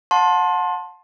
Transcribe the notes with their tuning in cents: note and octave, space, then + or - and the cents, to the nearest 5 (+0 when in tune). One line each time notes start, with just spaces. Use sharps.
F#5 -40 A5 +0 C6 +20